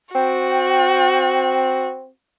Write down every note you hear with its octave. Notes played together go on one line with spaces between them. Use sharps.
C4 F#4 G5